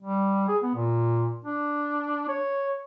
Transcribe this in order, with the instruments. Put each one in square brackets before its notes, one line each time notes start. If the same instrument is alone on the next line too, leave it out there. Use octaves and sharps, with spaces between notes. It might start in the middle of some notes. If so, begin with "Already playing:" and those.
[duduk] G3
G#4
B3
A#2
D4
C#5